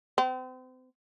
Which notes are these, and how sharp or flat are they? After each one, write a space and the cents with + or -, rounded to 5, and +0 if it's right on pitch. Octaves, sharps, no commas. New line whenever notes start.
C4 -35